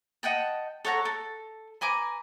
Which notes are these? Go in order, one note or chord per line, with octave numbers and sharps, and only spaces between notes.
D#5 F#5 G5 A5
A4 C#5 F#5 A#5
A4
B4 G#5 A#5 D6